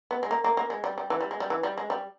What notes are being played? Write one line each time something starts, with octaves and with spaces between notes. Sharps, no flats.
B3
G#3
A#3
A#3
A#3
G#3
G3
G3
E3
G3
G#3
G3
E3
G3
G#3
G3